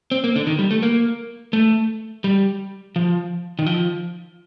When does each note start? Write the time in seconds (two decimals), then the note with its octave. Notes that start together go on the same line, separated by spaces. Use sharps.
0.11 C4
0.24 A#3
0.36 D3
0.47 D#3
0.59 G3
0.71 A3
0.83 A#3
1.53 A3
2.24 G3
2.96 F3
3.59 D#3
3.66 F3